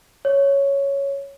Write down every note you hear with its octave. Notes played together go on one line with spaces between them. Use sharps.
C#5